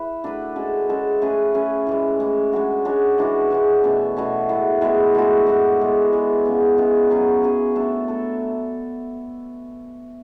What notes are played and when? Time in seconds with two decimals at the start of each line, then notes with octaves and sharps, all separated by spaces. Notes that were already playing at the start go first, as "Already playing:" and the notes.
Already playing: E4 B4
0.24 A3 D4 F#4 B4
0.56 G#3 C#4 F#4 A4
0.89 G#3 C#4 F#4 A4
1.21 A3 C#4 G#4 B4
1.54 A3 C#4 G#4 B4
1.87 A2 E3 G#3
2.20 A2 E3 G#3
2.52 G#3 D4 F#4 C#5
2.85 G#3 D4 F#4 C#5
3.18 E3 G#3 D4 F#4
3.50 E3 G#3 D4 F#4
3.84 B2 A3 C#4
4.17 B2 A3 C#4
4.49 A2 G#3 B3 E4
4.81 A2 G#3 B3 E4
5.15 A2 G#3 D4 F#4
5.47 A2 G#3 D4 F#4
5.80 E3 G#3 B3
6.13 E3 G#3 B3
6.45 C#3 G#3 B3
6.77 C#3 G#3 B3
7.10 F#3 C#4 G#4
7.43 F#3 C#4 G#4
7.75 A3 D4 A4
8.08 A3 D4 A4